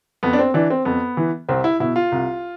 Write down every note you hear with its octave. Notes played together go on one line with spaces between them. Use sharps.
F2 B3
D4
C4
E3 D4
C4
F2 B3
E3
C2 C4
E4
B2 E4
F4
C2